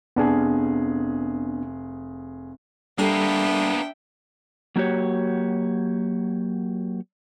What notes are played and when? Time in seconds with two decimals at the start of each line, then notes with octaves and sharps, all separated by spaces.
0.16 F1 B3 D4 G#4
2.98 G3 A#3 B3 D4 A4 E5 G5
4.76 F#3 A#3 F#4 G4 C#5